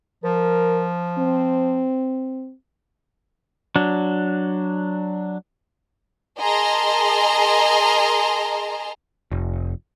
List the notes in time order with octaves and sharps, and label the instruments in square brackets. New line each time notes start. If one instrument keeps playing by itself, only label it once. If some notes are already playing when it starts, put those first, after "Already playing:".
[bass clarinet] F3 [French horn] A#4
[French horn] C4
[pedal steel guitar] F#3 D4
[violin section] G#4 A#4 D#5 A5 A#5 C6
[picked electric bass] F1